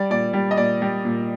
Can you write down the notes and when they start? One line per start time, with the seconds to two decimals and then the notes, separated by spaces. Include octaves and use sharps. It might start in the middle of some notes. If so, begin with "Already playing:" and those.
Already playing: G3 D5
0.10 A#2 D5
0.33 G3
0.51 D#5
0.57 A#2 D5
0.82 G3
1.05 A#2